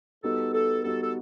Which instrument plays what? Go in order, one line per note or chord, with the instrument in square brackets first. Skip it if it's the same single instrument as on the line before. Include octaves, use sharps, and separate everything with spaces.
[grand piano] G3 B3 D#4 F#4 [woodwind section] A4
[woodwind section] A4
[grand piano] G3 B3 D#4 F#4 [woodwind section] A4
[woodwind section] A4